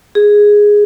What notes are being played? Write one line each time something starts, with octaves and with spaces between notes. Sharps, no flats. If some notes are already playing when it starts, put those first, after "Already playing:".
G#4